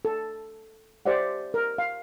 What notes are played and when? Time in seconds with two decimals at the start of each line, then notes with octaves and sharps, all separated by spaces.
0.05 A4
1.06 G4 C5 D5 E5 F#5
1.54 A#4
1.78 F5